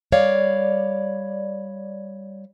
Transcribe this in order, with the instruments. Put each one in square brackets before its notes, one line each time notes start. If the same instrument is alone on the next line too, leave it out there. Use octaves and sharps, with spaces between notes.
[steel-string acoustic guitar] G3 C#5 D5 F5